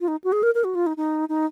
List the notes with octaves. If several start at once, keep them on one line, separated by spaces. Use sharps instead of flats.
F4
D#4
F#4
G#4
A#4
A#4
F#4
F4
D#4
D#4
D#4